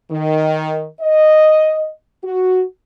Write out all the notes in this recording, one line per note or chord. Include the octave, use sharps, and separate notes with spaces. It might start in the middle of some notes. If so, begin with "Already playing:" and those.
D#3
D#5
F#4